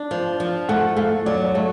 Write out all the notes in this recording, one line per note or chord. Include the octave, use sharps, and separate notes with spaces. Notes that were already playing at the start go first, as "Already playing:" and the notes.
Already playing: D4
F3
F3
A3 F#5
A3 F5
F#3 D5
C#5
A3